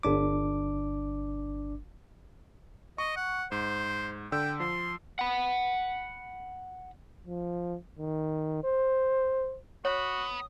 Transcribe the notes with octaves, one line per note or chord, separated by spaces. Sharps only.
G1 D4 D6
D#5 C#6
F#5
G#2 C5
D3 G5 E6
F3 C6
F#5 B5
F3
D#3
C5
B3 F#4 C#5 B5 D#6